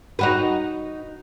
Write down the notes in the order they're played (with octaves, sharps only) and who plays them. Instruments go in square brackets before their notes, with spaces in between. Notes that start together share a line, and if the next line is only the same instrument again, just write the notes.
[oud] D#4 F#4 B4